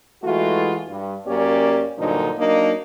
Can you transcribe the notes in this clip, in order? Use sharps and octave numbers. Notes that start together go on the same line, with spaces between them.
E3 G#3 A3 F4 F#4
G2
F#2 A#3 C#4 G4 C#5 D5
G2 A#2 D3 F3 F#3 D#4
F#3 A#3 D4 D#4